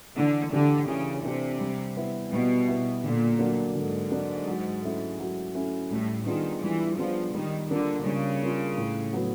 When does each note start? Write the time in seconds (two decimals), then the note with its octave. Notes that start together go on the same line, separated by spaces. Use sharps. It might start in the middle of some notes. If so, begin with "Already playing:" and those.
0.17 D3 E3
0.52 D3 A3 D4 G4
0.88 C#3 E3
1.24 C3 A3 D4 G4
1.60 G3
1.97 B3 E4
2.32 B2 G3
2.68 B3 E4
3.04 A#2 D3
3.39 F#3 A#3 D4
3.75 G#2 D3
4.11 F#3 A#3 D4
4.47 F#3
4.82 A3 C#4 E4
5.19 F#3
5.54 A3 C#4 E4
5.91 A2 G3
6.26 D#3 B3 D4 F4 G#4
6.62 E3 G3
6.98 F3 B3 D4 F4 G#4
7.34 D#3 G3
7.70 D3 A#3 D4 F4
8.06 C#3 G3
8.41 A#3 D4 F4
8.78 A2
9.13 F#3 B3